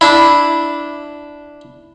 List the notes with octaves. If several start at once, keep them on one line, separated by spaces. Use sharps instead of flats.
D4 E4